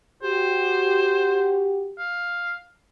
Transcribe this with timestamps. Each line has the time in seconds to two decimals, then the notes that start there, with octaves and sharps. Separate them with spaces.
0.23 F#4 G4 C5
1.98 F5